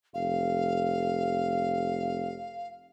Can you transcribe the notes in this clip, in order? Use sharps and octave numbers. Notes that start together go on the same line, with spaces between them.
F1 F5